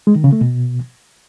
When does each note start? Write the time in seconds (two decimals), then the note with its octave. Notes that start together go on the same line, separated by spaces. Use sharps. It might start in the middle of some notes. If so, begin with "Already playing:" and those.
0.07 G#3
0.16 D#3
0.24 C#3
0.33 A3
0.41 B2